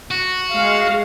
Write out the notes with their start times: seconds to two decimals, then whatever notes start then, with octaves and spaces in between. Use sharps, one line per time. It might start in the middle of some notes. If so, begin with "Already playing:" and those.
0.11 F#4
0.52 G#3 F5